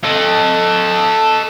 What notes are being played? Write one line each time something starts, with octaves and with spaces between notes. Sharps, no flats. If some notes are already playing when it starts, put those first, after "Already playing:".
A4 D#5